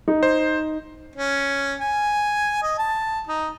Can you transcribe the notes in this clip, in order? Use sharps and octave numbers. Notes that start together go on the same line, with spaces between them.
D#4
C5
C#4
G#5
D#5
A5
D#4